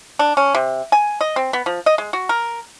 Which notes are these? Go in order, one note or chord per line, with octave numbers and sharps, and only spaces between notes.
D4
C#4
C3
G#5
D#5
C4
B3
F3
D#5
G#3
F#4
A#4